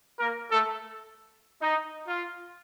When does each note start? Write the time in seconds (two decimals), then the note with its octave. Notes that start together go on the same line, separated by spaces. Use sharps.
0.19 A#3 A#4
0.50 A3 A4
1.60 D#4
2.07 F4